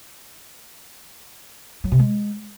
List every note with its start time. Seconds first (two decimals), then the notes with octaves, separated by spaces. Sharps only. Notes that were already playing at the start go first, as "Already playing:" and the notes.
1.84 F#3
1.92 C3
1.99 G#3